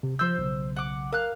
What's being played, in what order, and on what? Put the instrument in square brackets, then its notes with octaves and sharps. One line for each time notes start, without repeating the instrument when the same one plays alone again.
[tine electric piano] C3
[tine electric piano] F3 G6 [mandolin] C5 E6
[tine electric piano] B1 C#3
[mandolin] F#5 D6
[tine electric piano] A#4 [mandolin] F5 F#6